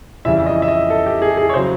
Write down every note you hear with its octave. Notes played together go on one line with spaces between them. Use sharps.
F2 C#3 E3 G3 E5
D#5
E5
D#5
A4
G4
G#4
G#4
C#5
C#3 F#3 C5